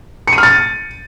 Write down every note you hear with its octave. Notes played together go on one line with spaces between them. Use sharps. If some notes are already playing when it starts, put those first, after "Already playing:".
C#7
D#7
F6
A6